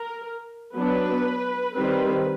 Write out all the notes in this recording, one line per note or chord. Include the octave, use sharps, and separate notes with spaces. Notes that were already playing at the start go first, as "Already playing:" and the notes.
Already playing: A#4
F#3 B3 D4 B4
D#3 G3 C4 B4